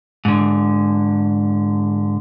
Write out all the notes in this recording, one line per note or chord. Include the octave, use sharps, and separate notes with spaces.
G#2 D3